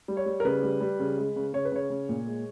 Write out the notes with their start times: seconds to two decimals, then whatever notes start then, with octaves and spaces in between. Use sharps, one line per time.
0.08 G3
0.17 C#5
0.26 G3
0.40 A#4
0.45 C#3 B4
0.63 G3
0.81 G3
1.00 C#3
1.18 G#3
1.36 C#3
1.53 C#3 C#5
1.65 B4
1.72 C#3 C#5
1.90 C#3
2.09 A#2
2.27 G#3